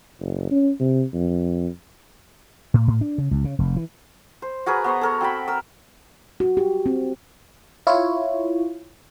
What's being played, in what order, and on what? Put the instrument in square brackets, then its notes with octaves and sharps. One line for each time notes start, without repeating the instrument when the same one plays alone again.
[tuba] F#1
C#4
C3
F2
[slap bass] A2
A2
D4
C#3
C#2
C#3
F1
E3
[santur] C5
F#4 G#4 A#4 B4
B3 C5 C#5 A#5
A4 A#4 C#5
C4 F#4 G5 B5
A#4 E6
[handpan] F#4
G4
C4
[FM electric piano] E4 F4 C#5